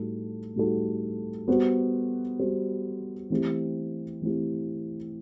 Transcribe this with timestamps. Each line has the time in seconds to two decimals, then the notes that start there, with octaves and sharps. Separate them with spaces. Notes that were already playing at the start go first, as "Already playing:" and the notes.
Already playing: A2 G3 D#4 F#4 A4
0.56 A2 G3 D#4 F#4 A4
1.48 G3 B3 F#4 C5
2.39 G3 B3 F#4 C5
3.30 E3 A3 C4 E4 G4
4.22 E3 A3 C4 E4 G4